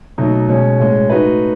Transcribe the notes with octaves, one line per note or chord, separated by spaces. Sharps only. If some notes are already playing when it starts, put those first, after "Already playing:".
B2 F#3 A3 D#4
B2 G#3 C#4
A2 G#3 C#4
A3 D#4 F#4 B4